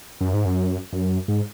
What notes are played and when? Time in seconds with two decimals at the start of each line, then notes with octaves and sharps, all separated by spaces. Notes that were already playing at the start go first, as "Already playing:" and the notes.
0.21 F#2
0.34 G#2
0.45 F#2
0.93 F#2
1.28 G#2